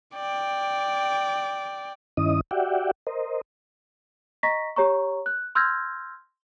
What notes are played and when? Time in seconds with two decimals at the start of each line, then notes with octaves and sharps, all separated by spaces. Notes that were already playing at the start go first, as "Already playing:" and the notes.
0.15 D5 G5
2.17 G2 D#3 C#4 E4 D#5 D#6
2.51 F#4 G4 D5 E5 F#5 G5
3.07 A#4 C5 D#5
4.43 D#5 A#5 C#6 A#6 B6
4.76 G4 C#5 A#5 C#6
5.26 F#6
5.55 C6 E6 F6 G6 G#6 A#6